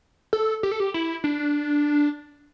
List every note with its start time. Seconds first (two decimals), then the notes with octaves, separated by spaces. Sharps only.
0.33 A4
0.63 G4
0.72 A4
0.80 G4
0.94 E4
1.24 D4